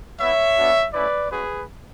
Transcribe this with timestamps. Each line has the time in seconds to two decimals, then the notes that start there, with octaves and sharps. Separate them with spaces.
0.20 B3 E4 C#5 E5
0.57 B3 D4 F#4
0.93 A3 C#4 E4 B4 D5
1.31 G#3 C#4 F#4 G#4 B4